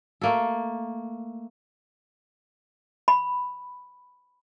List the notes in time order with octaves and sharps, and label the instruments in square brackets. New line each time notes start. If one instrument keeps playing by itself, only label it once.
[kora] A3 A#3 A4
[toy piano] B5